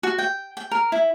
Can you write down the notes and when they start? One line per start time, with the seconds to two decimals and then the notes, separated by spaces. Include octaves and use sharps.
0.03 F#4
0.18 G5
0.57 G5
0.71 A#4
0.92 E4